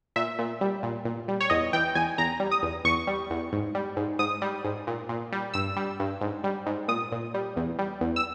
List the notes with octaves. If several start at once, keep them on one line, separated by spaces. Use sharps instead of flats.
A#2 E5
A#2
G3
A#2
A#2
G3
C#5
E2 D#5
E3 G5
E2 G#5
E2 A#5
G3
D#6
E2
E2 C#6
G3
E2
G#2
G3
G#2
G#2 D#6
G3
G#2
A#2
A#2
G3
G2 E6
G3
G2
G#2
G3
G#2
A#2 D#6
A#2
G3
E2
G3
E2
E6